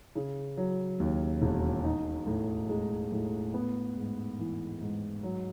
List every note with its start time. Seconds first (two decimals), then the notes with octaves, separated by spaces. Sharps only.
0.15 C#3
0.57 F#3
1.00 D#2
1.42 E1
1.84 D#4
2.27 A2
2.69 G#3
3.12 A2
3.54 B3
3.96 G#2
4.39 E3
4.81 G#2
5.23 F#3